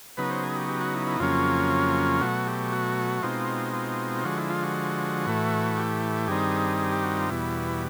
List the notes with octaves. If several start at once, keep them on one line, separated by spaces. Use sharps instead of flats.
C#3 F#3 B3 D#4 B4
C5
G#4
G4
G4
F#4
E4
E4
F2 C#3 F#3 A#3 C#4 F4
B2 F#3 A3 F#4
G4
F#4
B2 G#3 C4 D#4 F4
F4
D3 F3 G#3 F#4
E4
F4
F#4
A2 E3 A3
G4
G2 D#3 G3 C4 D#4 G#4
G#4
G4
F#4
F4
E2 B2 G3 E4